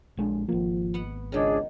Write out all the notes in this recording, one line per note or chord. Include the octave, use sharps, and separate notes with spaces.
A#1 G#3 D4
G#1 F3 A#3
B3 F#5
C#2 D#3 F#3 D4 G#4 C#5 G5